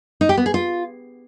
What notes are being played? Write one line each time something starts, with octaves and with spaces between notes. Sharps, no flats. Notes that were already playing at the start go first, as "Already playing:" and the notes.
D#4
G4
B3
G#4
F4